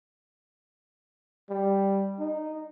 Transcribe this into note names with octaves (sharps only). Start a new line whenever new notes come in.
G3
D#4